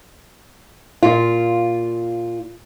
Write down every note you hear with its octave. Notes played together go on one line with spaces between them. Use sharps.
A#2 F4